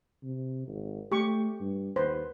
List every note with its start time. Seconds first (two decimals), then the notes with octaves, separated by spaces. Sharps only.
0.23 C3
0.67 G#1
1.12 A3 G4 C#6
1.60 G2
1.96 D#2 B4 C5